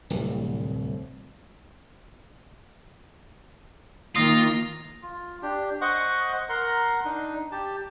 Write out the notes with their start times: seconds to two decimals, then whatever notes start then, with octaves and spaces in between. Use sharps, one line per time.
0.10 D1 C2
4.16 D#3 A#3 F4 D#6 A#6
5.03 F4
5.42 D4 G4
5.81 C5 D#5 F#5 C#6
6.49 A#4 F#5 A#5 C6
7.04 D4 D#4
7.52 G4 A5